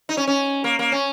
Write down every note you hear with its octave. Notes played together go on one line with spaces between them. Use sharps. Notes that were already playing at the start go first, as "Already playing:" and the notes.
D#4
C#4
C#4
A#3
A#3
C#4